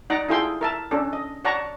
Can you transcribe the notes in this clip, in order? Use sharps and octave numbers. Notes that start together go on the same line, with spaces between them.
D#4 D5 F#5 A#5 D6
E4 F4 G#4 A4 G5 C6
A#4 E5 A5
C#4 D4 A4
D#5
C#5 D5 F#5 A5 A#5 C#6